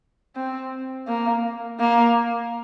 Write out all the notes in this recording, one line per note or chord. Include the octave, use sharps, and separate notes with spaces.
C4
A#3
A#3